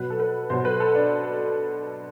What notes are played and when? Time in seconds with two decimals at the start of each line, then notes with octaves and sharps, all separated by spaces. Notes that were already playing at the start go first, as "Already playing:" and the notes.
Already playing: B2 F#3 B4
0.10 A4
0.20 B4
0.50 B2 F#3 C5
0.65 B4
0.80 A4
0.95 D4